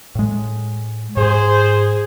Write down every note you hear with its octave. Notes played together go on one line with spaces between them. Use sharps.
A2 G#3
G#2 G#4 C5